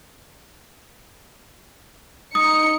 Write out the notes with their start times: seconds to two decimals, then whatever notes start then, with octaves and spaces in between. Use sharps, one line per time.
2.35 D#4 D#6 C#7